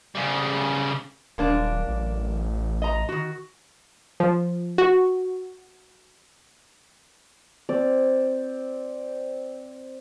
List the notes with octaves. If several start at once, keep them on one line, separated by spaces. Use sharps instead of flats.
C#3 G3
D#1 F#2 A#3 D4
A1
D#5 A#5
D#3 F#4
F3
F#4
C4 D5